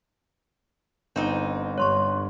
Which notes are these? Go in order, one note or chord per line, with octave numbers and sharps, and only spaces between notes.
G1 C4 D#4
G2 C#5 C6 C#6